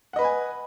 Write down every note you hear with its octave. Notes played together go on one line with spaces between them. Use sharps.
B4 D#5 F#5 G#5 B5